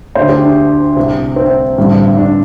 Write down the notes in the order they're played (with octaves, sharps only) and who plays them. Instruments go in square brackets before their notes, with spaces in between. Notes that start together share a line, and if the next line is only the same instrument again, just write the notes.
[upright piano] D2 D3 C5
G4
D4
C2 C3
C4
A1 G2 D3
D4